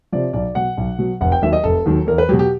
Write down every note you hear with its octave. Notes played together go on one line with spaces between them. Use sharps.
C3 F3 D5
B1 D5
B2 F#3 F#5
B1
B2 F#3
F1 F#5
G5
D#2 D#3 F#3 E5
D#5
F1 A4
D#2 D#3 F#3
E2 A#4
B4
B2 F#3 G4
G4